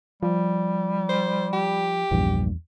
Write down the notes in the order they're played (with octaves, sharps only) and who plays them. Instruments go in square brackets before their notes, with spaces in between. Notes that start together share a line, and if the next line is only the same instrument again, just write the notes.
[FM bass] F3 [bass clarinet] G3
[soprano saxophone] C5
G4
[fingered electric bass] A#1 G2 [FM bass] E2